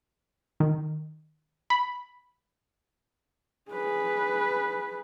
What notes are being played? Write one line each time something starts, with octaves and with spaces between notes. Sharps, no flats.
D#3
B5
G#4 B4